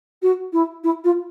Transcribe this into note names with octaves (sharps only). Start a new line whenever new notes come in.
F#4
E4
E4
F4